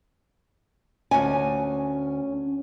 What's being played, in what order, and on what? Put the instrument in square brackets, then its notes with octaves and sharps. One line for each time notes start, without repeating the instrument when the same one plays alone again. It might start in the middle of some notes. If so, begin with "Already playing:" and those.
[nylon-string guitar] D2 G#5 [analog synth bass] C#4